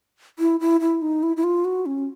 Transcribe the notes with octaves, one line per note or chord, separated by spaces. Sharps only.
E4
E4
E4
D#4
E4
E4
F4
F#4
C#4